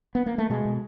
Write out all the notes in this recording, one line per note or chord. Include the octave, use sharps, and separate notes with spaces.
B3
A#3
A3
B2 G#3
B2